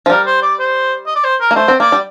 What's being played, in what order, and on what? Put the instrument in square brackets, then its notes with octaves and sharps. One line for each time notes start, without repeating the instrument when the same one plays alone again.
[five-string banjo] F3
[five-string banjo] G3 [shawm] A#4
[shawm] C5
D5
C5
D#5
D5
C5
A#4
[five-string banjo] A#3
[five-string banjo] A3 [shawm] C5
[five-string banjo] C4
[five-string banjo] A#3 [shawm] D5
[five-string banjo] G3